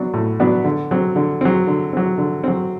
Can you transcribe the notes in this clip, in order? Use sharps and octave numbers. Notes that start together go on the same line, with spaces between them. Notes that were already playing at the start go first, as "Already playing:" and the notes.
Already playing: F#3 B3 D4 F#4
A2
F#3 B3 D4 F#4
D3
F#3 C4
D3
F#3 C4
D3
F#3 C4
D3
F#3 C4